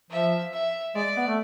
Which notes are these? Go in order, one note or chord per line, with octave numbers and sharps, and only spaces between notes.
F3 E5
E5
G#3 D5
B3
A3